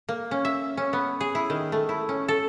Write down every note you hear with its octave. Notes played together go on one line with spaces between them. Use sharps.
A#3
C#4
E5
C#4
B3
G#4
E4
D#3
A3
E4
C#4
A4